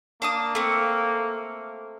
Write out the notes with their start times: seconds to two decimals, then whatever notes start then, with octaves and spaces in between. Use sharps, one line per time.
0.22 A#3 D4 A5 D#6
0.55 A3 C4